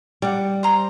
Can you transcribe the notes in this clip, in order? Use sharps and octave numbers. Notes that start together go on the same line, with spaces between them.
G3 F#5 D6
C5 A#5 C6